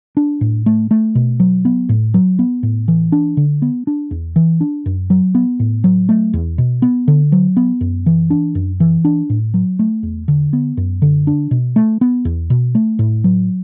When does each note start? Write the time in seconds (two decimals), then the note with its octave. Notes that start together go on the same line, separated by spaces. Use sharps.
0.17 D4
0.41 A2
0.66 A3
0.91 A3
1.15 B2
1.40 F#3
1.65 B3
1.89 A2
2.14 F#3
2.39 B3
2.63 A2
2.88 E3
3.12 D4
3.37 D3
3.62 B3
3.87 D4
4.11 E2
4.36 E3
4.61 D4
4.86 F#2
5.10 F#3
5.35 B3
5.60 A2
5.84 F#3
6.09 A3
6.34 E2
6.58 B2
6.82 B3
7.08 D3
7.32 F#3
7.57 B3
7.81 F#2
8.06 E3
8.30 D4
8.55 F#2
8.80 E3
9.05 D4
9.30 A2
9.54 F#3
9.79 A3
10.03 E2
10.28 D3
10.53 B3
10.77 F#2
11.02 D3
11.27 D4
11.51 B2
11.76 A3
12.01 B3
12.25 E2
12.50 B2
12.75 A3
12.99 A2
13.24 F#3